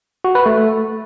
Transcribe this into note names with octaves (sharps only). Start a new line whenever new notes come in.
F#4
B4
A3